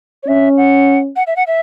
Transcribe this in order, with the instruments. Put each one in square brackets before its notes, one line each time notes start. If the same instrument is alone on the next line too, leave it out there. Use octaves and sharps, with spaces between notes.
[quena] C#5
[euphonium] C#4 [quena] E5
[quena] F#5
F#5
E5
F#5
E5